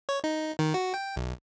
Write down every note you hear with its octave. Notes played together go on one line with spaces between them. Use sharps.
C#5
D#4
D#3
F#4
G5
B1